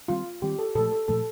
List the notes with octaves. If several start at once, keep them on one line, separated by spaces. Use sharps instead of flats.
D#3 G3 C4 F4
D#3 G3 C4 G4
A4
A#2 F3 A3 A4
A4
A#2 F3 A3 A4